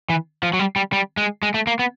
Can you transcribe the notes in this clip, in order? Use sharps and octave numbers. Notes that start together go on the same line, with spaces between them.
E3
F3
F#3
G3
G3
G3
G#3
G#3
A3
A#3
B3